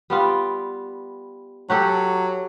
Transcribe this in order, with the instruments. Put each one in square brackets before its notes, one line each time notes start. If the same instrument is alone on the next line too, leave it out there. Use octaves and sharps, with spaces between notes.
[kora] G3 B3 F4
[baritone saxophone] F#3 [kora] F#4 G4 A4